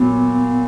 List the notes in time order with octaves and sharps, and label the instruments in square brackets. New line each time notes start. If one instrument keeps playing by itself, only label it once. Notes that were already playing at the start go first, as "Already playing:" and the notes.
Already playing: [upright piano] A#2 F#3 [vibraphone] B3